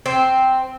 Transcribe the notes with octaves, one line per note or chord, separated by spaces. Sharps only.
C4